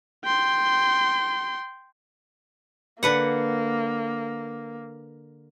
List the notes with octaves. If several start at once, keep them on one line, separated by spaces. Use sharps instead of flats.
G5 C6
D3 A#3 B4 F#5